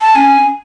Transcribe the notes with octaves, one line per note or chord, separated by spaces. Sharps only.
A5
C#4 G#5